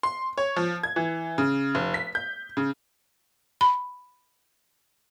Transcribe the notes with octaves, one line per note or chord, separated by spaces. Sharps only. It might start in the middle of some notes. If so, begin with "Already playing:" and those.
C6
C#5
F3
G#6
E3
C#3
F1
B6
G6
C#3
B5